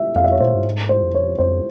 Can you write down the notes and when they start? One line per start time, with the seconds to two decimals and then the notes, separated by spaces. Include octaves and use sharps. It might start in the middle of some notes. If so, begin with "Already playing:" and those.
Already playing: E5
0.16 F2 F5
0.24 E5
0.32 C#5
0.40 A#2 C5
0.55 G2
0.64 G#2
0.89 C5
1.02 F2
1.14 C#5
1.39 F2 C5